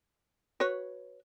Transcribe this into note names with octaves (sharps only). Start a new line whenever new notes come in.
F#4 B4 C#5